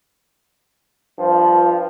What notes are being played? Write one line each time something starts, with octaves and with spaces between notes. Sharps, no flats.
G2 F3